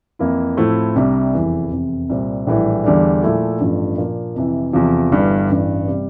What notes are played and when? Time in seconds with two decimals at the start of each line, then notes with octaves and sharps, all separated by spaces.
0.19 F2 E3 A#3 E4
0.57 A2 F3 A3 C4 E4
0.96 C2 C3 G3 D4
1.33 F1 E2 E3
1.71 F1 E2 C3
2.09 C2 A#2 G3 C4
2.47 A#1 A2 E3 G3
2.84 E2 D3 G3 D4
3.22 A#2 F3 A3 E4
3.61 A1 G2 F3 A3
3.98 A#2 F3 A#3 D4
4.35 F2 C3 E3
4.73 E2 C3 F3
5.11 G1 G2 E3 G3
5.50 A1 G2 E3
5.88 C3 G3